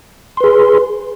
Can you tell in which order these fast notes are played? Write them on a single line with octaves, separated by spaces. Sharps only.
C6 B4 G#4